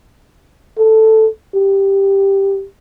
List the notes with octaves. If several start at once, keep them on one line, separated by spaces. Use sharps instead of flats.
A4
G4